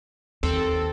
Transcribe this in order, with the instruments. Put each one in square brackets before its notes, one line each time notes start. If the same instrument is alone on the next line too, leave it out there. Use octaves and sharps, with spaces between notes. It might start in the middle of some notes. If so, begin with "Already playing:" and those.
[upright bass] D#2 [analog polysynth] C4 A4